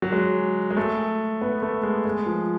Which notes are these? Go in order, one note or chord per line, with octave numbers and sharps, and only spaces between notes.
F#3
G#3
G#3
A3
B3
A3
G#3
G#3
F3